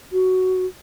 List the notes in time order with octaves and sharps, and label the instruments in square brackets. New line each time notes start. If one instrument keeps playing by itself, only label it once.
[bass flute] F#4